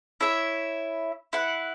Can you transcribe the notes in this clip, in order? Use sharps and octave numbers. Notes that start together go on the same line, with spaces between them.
E4 C#5 E5
E4 B4 F#5